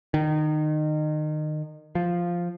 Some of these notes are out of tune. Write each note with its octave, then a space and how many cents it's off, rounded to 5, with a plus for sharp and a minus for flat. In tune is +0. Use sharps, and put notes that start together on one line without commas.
D#3 -25
F3 +0